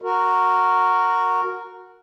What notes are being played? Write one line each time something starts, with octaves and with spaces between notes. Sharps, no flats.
F#4 A#4